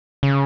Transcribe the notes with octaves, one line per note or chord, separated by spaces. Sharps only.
C#3